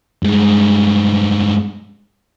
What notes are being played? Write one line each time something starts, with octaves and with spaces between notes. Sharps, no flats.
G2 G#3